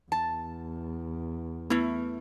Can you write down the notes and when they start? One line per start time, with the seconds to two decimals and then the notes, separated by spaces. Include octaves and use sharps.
0.12 E2 A5
1.70 A3 B3 E4